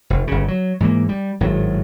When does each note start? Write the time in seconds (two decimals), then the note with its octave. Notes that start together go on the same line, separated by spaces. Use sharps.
0.10 F1
0.27 G1 C#3
0.48 F#3
0.80 G#2 E3 G#3 A#3
1.09 G3
1.40 G#1 A2 F#3